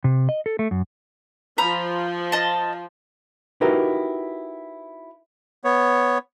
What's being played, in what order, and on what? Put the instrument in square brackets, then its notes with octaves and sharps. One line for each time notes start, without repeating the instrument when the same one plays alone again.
[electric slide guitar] C3
D#5
A4
A3
F#2
[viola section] F3 [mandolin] A#5 B5
[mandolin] D#5 A5
[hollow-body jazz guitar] D#4 E4 F#4 G4 A#4 B4
[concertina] B3 C#5